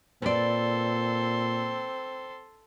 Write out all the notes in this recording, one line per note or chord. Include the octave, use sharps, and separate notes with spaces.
A#2 C4 A4 B4 D5 C6